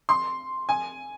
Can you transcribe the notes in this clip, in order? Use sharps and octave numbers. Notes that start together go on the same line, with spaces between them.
C6
G#5